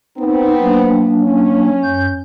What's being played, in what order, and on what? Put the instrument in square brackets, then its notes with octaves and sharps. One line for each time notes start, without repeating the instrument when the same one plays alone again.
[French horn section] B3 C4 [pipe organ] D#4
[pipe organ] F#3 A#3 D4
[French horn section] C#4
[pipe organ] F#2 G6